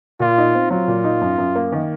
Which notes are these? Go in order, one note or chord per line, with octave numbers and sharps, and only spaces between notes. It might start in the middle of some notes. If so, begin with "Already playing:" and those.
A#2 F4
D#4
C4
F#3 F4
A#2
D#4
F#2
F#2
A#3
D#3